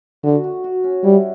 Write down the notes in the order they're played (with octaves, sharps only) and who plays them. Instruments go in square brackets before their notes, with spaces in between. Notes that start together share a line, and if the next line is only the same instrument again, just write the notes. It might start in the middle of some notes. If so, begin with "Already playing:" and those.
[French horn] D3 [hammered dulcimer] F#4
[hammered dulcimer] F#4
F#4
C#4
[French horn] G3 [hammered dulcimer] E4